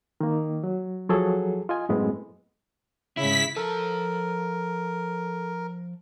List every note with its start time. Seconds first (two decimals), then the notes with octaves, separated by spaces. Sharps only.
0.21 D#3 A#3
0.64 F#3
1.09 F3 F#3 G#4 A4
1.69 F4 D#5 G#5
1.89 F#2 A2 G#3 B3 C4
3.17 G#2 C#3 E4 B6
3.57 F3 A4 A#4 A5